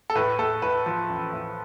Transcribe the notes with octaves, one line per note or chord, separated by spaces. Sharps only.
A4
A2 B4
A2 A4
A2 B4
F3
A1
A2